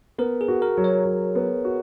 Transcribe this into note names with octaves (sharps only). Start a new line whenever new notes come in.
B3 A#4
G#4
F#4
A#4
F#3
C#5
F#3
B3
F#4